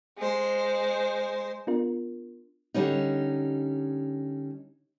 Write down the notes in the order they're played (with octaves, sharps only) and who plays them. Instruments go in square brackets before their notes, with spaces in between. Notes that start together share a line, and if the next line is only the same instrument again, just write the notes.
[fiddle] G#3 C5
[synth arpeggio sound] B3 D4 F4 A#4
[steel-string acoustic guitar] D3 G3 C#4 D#4